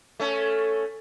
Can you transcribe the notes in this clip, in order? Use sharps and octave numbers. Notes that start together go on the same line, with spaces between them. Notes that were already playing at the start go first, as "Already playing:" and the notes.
A3 C#4